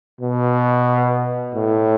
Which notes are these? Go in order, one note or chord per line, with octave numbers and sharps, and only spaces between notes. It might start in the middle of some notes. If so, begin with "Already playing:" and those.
B2
A2